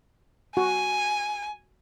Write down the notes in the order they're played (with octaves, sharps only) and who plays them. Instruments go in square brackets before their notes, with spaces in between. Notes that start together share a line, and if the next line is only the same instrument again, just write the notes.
[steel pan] F#4 [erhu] G#5